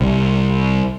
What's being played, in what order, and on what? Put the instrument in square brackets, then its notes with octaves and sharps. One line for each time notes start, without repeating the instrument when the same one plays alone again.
[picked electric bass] C2